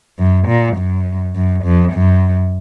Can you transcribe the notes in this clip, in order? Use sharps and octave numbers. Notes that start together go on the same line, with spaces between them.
F#2
A#2
F#2
F#2
F2
F#2